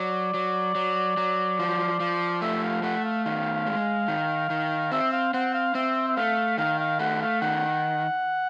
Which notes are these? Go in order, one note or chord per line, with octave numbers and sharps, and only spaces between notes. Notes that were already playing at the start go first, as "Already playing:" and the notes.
Already playing: F#3 D5
F#3
F#3
F#3
F3
F3
A3 E5
F5
A3 F#5
F5
D#3 F5
G#3
D#3
D#3
C4 E5
F5
C4 F#5
F5
C4 E5
E5
A3 F5
D#3 F5
F5
A3 F#5
F5
D#3 F#5